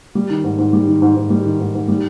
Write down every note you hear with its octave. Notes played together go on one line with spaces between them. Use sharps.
G3
D#3
G#2
G#2
G3
D#3
G#2
G#2
G3
D#3
G#2
G#2
G3